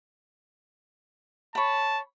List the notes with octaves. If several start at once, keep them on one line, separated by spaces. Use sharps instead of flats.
C#5 A5 B5